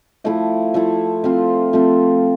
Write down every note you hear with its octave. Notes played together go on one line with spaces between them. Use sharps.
F3 A3 E4 A4
F3 A3 E4 A4
F3 A3 C4 F4
F3 A3 C4 F4